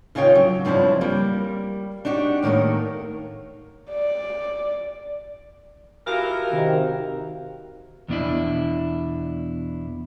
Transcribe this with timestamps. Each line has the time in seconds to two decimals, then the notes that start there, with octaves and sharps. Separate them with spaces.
0.15 D#2 C#3 C#4 D#4 F4 G5
0.35 F#3
0.65 G2 C#3 F3 C4 D4 E4
1.01 G3 A#3
2.05 D4 D#4 F#4 G4
2.42 A2 D#3 A3 A#3 A#4
3.91 D5
6.07 E3 F3 F#4 G4 A#4 F5
6.52 C3 D#3
8.08 E2 B2 D4 E4